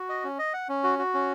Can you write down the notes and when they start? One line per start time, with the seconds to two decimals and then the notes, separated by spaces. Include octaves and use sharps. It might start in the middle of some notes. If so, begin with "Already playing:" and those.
Already playing: F#4
0.09 D#5
0.24 C#4
0.39 D#5
0.54 F#5
0.69 C#4
0.84 F#4
0.99 F#4
1.14 C#4